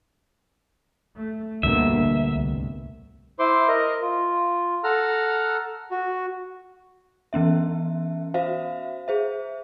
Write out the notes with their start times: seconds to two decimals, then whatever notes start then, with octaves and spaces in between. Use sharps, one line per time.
1.17 A3
1.63 D2 G2 B2 D3 A#3 E5
1.99 A1
2.29 C2
3.39 E4 C5 C6 D6
3.68 A#4 D#5
4.01 F4
4.84 A4 F#5 A#5 F6
5.91 F#4
7.33 E3 B3 C#4 E5
8.34 F#4 C5 E5 F5
9.08 G#4 C5 E5